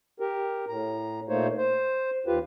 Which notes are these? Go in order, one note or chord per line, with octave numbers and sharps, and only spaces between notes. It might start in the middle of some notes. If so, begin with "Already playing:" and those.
G4 A#4
A2 A#5
A#2 A3 A#3 D#4 C5 C#5
C5
D#2 F4 G4 B4